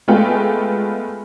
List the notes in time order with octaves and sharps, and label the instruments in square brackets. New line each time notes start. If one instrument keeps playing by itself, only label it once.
[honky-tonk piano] G#3 A3 B3 F4 B4 G5